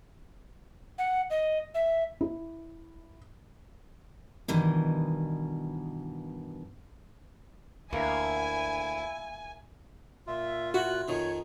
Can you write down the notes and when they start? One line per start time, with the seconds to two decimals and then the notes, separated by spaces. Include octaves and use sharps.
0.98 F#5
1.30 D#5
1.74 E5
2.21 E4
4.48 G2 B2 D#3 E3
7.93 D2 A#3 E4 G#5
10.27 A#2 F4 E5
10.74 E4 F#4 F#6
11.08 F2 D#3 F3 C#5